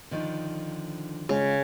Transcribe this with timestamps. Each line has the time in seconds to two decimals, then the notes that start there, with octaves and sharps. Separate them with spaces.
0.11 D3 D#3 F3
1.29 C#3 G#3 F4